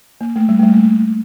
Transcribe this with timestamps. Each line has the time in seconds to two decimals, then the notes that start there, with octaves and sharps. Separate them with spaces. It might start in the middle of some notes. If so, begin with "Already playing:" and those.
0.21 A#3
0.36 A3
0.49 G3
0.59 A3
0.63 G3
0.72 A#3
0.77 A3